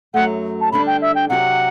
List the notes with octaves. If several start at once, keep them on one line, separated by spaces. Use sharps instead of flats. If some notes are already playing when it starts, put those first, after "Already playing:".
F#2 F#3 A3 F#5
A5
D3 G3 D4 B5
G5
E5
G5
C3 F#3 C4 G4 F#5